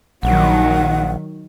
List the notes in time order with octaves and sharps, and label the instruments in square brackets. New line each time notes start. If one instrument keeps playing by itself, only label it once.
[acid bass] A#1 [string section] D#3 F#3 [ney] F#5